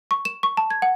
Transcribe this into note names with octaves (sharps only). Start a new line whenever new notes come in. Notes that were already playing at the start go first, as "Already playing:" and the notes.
C#6
E7
C#6
A5
G#6
F#5